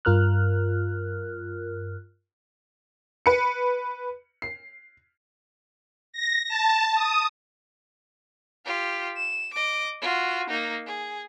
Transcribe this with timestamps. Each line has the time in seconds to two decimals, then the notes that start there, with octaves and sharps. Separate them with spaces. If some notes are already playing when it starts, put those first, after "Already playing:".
0.05 G2 F4 A#4 F6 F#6
3.26 B4 C#7
4.42 C7
6.13 A#6
6.48 A5
6.95 D#6
8.65 F4 G4
9.17 E7
9.53 D#5 D6
10.01 F4 F#4
10.49 A#3 D#4
10.86 G#4